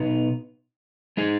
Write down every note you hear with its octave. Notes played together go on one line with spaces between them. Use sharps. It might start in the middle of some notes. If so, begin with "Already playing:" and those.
Already playing: B2 B3 D#4
G#3 D#4 G#4